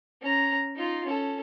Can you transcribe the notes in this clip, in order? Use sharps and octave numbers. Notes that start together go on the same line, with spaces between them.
C#4 A#5
D#4 F4
C#4 A4